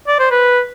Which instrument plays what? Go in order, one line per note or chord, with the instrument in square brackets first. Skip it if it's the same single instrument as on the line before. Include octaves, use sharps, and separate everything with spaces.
[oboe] D5
C5
B4